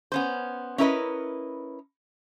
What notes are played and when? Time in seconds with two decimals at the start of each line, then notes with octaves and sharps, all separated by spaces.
0.12 B3 C#4 C5
0.78 C#4 E4 A#4 B4 D#5